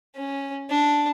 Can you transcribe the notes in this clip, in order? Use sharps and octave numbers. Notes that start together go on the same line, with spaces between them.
C#4
D4